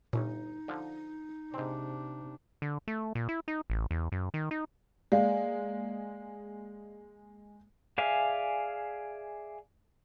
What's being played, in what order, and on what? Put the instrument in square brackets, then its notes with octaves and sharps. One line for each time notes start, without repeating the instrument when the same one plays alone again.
[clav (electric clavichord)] G1 C#4 [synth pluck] A#2 [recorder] D#4
[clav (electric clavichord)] D3 F3
[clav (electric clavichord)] G#2 C4 [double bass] C3 D4
[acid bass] D3
A3
A#2
E4
D#4
A1
E2
F#2
D#3
D#4
[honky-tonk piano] G#3 A#3 [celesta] D5 F5
[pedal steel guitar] G#4 D5 E5 F5 G#5